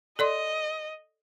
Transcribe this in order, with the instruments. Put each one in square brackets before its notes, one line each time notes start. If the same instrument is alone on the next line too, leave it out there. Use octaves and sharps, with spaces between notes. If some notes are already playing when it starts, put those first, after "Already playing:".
[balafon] A4 D5 C6 [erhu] D#5